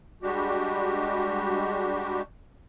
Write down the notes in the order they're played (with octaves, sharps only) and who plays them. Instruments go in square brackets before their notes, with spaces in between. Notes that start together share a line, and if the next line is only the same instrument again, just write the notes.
[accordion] G3 G#3 D4 F#4 G4